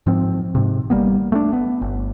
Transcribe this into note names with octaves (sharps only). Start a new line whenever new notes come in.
G#2 F3 C4
G#2 C3
G#1 G3 A#3 B3
A3 A#3 D4
B3
G1